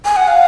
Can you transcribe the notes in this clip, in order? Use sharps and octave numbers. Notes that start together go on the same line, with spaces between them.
G#5
F#5
F5